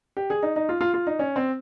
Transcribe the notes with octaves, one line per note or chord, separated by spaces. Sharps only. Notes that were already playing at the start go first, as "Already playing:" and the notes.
G4
G#4
D#4
D#4
F4
F4
F4
D#4
C#4
C4